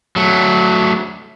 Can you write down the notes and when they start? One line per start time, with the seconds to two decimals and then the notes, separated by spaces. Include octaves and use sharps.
0.16 F#3 A3